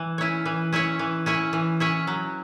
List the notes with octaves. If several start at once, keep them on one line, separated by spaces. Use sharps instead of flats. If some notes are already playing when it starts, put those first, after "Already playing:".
Already playing: E3
C#4 E4 C#5
E3
C#4 E4 C#5
E3
C#4 E4 C#5
E3
C#4 E4 C#5
F#3